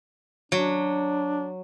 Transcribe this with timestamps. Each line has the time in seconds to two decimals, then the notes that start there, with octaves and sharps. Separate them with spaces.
0.52 F#3 D4